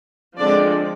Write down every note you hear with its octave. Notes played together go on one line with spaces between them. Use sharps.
D3 F3 G#3 C4 D4 D5